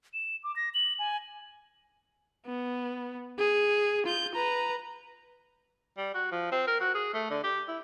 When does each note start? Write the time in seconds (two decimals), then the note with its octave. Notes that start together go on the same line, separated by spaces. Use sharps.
0.14 E7
0.44 D6
0.56 A#6
0.74 F#7
0.99 G#5
2.46 B3
3.39 G#4
4.06 F4 G6
4.34 B4 A#5
5.97 G3
6.14 F#4
6.32 F3
6.52 C4
6.67 A#4
6.81 F#4
6.94 G#4
7.14 A3
7.30 D3
7.44 G4
7.68 E4